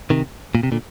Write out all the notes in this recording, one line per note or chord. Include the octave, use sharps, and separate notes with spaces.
C3 D#3
A#2
C3
A#2 D3